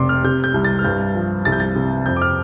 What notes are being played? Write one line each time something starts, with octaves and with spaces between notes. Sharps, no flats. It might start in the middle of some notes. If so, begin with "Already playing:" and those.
Already playing: F1 C3 D5 C6 D6
F6
C3 G6
G6
C2
A6
F6
G2 G6
F3
C2 A6
G6
A6
C3
F2 G6
D6
F6